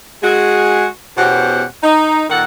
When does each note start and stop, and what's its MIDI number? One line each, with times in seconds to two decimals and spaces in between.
0.23 0.86 56
0.23 0.86 66
0.23 0.86 68
1.18 1.64 40
1.18 1.64 47
1.18 1.64 61
1.18 1.64 67
1.18 1.64 72
1.18 1.64 78
1.83 2.24 63
2.30 2.44 46
2.30 2.44 51
2.30 2.44 69
2.30 2.44 78